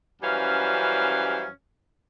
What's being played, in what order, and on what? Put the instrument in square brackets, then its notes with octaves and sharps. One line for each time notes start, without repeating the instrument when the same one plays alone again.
[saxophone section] F#2 E3 G3 C#4 C5 F5